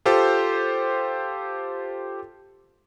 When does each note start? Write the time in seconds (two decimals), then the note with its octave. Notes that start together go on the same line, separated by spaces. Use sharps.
0.05 F4 G4 A4 C5